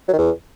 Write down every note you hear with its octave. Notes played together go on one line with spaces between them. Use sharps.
F#3
D#3
E2